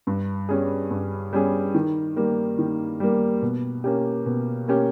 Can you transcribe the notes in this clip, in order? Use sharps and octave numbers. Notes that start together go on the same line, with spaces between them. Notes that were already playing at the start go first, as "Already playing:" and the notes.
G2
G3 C#4 G#4
G2
G3 C#4 G#4
D#3
G3 A#3
D#3
G3 A#3
B2
A#3 C#4 G4
B2
A#3 C#4 G4